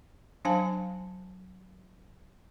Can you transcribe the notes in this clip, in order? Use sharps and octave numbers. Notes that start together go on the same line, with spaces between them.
F#3 D4 C5 F5 G#5 A5